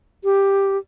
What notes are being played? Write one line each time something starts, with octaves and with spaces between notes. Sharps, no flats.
G4